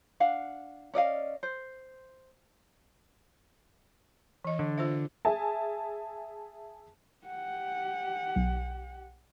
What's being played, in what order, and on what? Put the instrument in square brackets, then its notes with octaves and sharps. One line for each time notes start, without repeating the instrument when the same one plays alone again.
[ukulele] D4 F5 F#5
C#4 D5 D#5 F5
C5
[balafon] E3 D#5
[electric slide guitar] D3
[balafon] F4 C5 E5
[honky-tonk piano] G#4 E5 G#5 A5
[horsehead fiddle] G4 F#5
[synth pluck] B1